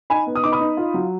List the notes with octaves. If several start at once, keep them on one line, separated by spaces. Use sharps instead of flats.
D#4 G#5 B5
B3
D#6
D#4 D6
B5 D#6
D#4
F4
F#3